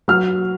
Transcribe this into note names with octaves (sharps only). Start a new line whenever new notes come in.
F#3 F6